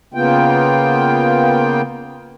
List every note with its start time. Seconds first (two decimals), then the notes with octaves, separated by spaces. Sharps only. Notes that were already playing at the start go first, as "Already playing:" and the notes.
0.14 C#3 A#3 B3 F4 G5